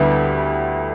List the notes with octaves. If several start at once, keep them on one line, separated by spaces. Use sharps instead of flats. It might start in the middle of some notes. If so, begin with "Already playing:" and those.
Already playing: D2 D3 G3 B3 E4